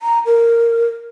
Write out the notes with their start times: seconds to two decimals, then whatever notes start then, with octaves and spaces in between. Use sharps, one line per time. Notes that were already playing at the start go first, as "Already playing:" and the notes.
0.02 A#5
0.26 A#4